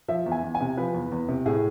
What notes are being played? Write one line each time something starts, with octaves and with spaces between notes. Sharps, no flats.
F3 E5
E2
G#5
E2
G#5
C3
F3 B4
E2
E2
C3
A2 G#4